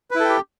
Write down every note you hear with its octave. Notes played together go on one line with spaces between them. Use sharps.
E4 G4 A4 B4 G5